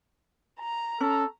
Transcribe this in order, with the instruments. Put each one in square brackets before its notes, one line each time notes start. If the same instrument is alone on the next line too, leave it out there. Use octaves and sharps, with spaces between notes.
[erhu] A#5
[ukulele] C#4 [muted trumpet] A4